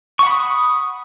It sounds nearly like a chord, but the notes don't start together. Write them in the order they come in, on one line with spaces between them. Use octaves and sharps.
C#6 F#5 B5 D#6